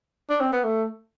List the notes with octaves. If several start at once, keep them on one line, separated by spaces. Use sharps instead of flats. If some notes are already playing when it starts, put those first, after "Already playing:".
D4
C4
B3
A3